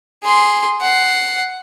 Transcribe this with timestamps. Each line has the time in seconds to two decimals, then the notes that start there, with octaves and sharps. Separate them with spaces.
0.24 G#4 C6
0.81 F#5 C7